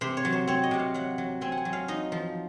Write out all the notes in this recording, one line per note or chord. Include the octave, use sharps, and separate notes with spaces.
C3 C5
C#5
F#3
C5
C4 C#5
D#5
C3 F#5
F5
F#3 F#5
F#3
C4 G#5
F#5
G#5
F#3
F5
D#4 D#5
F3